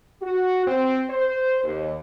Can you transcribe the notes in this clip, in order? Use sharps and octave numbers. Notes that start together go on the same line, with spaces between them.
F#4
C4
C5
D#2